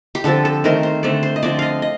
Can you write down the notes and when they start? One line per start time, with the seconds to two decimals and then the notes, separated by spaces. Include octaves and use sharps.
0.15 G4
0.24 D3 F3 C4 A4
0.45 A4
0.64 D#3 A3 C4 A#4
0.83 C5
1.03 D3 A3 C4 D5
1.23 C5
1.36 D#5
1.43 D3 F3 C4 D5
1.59 D#5 F5
1.82 D#5